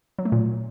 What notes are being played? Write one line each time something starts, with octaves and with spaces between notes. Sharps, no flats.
F#3
A3
A#2